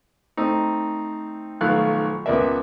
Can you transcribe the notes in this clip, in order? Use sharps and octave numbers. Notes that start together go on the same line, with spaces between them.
A3 C4 D#4
B1 D#3 F3 A3 F5 F#6
C#2 B3 A#4 D5 E5